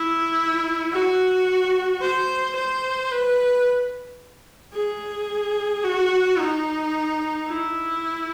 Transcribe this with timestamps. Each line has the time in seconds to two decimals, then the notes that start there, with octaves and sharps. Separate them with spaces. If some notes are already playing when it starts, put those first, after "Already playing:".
Already playing: E4
0.93 F#4
2.01 C5
2.56 C5
3.11 B4
4.74 G#4
5.84 F#4
6.39 D#4
7.48 E4